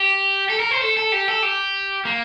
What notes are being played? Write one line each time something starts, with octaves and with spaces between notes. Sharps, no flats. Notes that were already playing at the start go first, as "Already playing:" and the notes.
Already playing: G4
A4
A#4
C5
A4
A4
G4
A4
G4
A#3